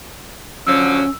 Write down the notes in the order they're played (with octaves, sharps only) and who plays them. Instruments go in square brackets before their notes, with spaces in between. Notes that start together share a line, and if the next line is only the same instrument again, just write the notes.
[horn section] D3 F3 F#3 [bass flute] C#4 [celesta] E6